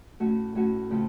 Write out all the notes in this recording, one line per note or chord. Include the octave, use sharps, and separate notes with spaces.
A2 A3 C#4 F#4
A2 A3 C#4 F#4
C#3 A3 C4 F4 A4